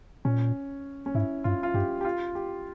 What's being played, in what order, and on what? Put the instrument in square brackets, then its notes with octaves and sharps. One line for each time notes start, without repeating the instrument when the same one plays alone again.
[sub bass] A#2 [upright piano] C#4
[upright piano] C#4
[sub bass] G#2 [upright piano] E4
[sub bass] G2 [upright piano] F4
[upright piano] F4
[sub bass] G2 [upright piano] G4
[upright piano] G4
F4
G4